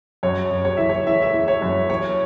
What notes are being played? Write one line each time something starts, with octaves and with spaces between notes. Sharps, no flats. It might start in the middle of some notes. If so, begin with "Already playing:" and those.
F#2 C#5
F#2
C#5
E3 E5
C#5
E3 E5
E5
E3
C#5
F#2
E3 C#5